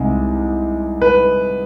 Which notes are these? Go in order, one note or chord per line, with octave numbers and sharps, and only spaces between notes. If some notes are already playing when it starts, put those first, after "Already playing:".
Already playing: C2 C3 D#3 G#3
B4